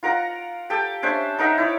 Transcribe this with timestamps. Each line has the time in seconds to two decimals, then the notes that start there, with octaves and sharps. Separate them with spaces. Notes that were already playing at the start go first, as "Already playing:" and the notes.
0.03 F4 A#4 F#5 A#5
0.70 G4 A4 G5 A5
1.03 C#4 D4 C5 E5
1.38 D#4 A#4 E5 F#5
1.58 E4 C#5 D5